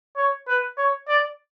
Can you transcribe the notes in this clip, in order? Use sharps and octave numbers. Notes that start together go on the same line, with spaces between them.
C#5
B4
C#5
D5